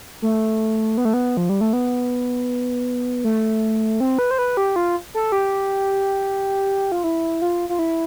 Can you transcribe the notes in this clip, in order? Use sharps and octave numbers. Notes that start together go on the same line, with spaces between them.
A3
B3
A3
B3
F3
G3
A3
B3
A3
C4
B4
C5
B4
G4
F4
A4
G4
F4
E4
F4
F4
E4